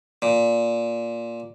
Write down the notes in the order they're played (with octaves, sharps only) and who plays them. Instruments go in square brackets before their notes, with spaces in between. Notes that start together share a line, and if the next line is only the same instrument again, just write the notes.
[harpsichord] A#2